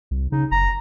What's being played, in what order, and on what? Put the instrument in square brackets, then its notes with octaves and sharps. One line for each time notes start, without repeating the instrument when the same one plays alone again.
[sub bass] C2
[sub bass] C#3 [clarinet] D#4
[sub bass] F#1 [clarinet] A#5